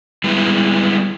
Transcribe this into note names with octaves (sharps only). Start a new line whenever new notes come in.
G3 G#3 B3 E4 B4